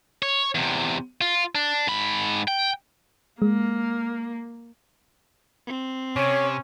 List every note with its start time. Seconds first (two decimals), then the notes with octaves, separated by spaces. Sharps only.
0.23 C#5
0.55 E2 C3
1.21 F4
1.55 D4
1.87 G#2 B5
2.48 G5
3.42 G#3 A#3
5.67 C4
6.16 C3 C#4 C#5